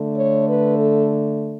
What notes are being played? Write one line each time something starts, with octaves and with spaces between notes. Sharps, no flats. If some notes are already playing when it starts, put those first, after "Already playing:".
Already playing: D3 A3
C#5
B4
A4